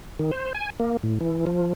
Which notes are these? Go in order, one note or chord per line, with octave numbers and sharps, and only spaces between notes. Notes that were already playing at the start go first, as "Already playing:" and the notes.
D#3
C5
G#5
A#3
A2
E3
F3